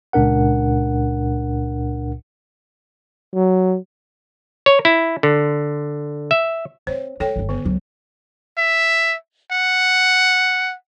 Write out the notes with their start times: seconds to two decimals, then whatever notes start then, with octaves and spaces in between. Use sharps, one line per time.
0.13 C#2 A#2 D4 A#4 F#5
3.34 F#3
4.66 C#5
4.85 E4
5.23 D3
6.31 E5
6.87 C4 C5 C#5
7.20 G#3 A4 C#5 G5
7.36 G1 D#3
7.49 D3 B3
7.65 C#2 F#3
8.58 E5
9.52 F#5